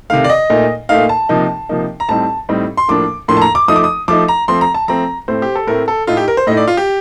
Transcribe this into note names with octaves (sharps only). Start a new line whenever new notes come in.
C3 D#3 A3 F5
D5
D#5
A#2 A3 D#4
A#2 A3 D#4 F5
A5
C3 F3 A#3 D#4
C3 F3 A#3 D#4
A#5
A2 G3 C4 D#4 A5
A2 G3 C4 D#4
C6
A2 F3 A#3 D4 D6
A2 F3 A#3 D4 C6
A5
A#5
D6
F3 A3 D#4 D#6
D6
D#6
F3 A3 D#4 D6
A#5
F3 A3 C4 C6
A#5
A5
F3 A3 C4 A#5
A2 A3 C4 C5
G4
A4
A2 A3 C4 A#4
A4
A2 A3 D#4 F4
G4
A#4
C5
A2 A3 D#4 D#5
D5
F4
G4